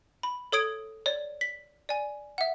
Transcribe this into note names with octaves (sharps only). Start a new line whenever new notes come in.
B5
A4 C#5 D#6 G#6 D7
C#5 D5
B6
D5 G#5
E5 F#5